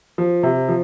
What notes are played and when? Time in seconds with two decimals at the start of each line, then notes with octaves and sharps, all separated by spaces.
0.18 F3
0.43 C3
0.69 F3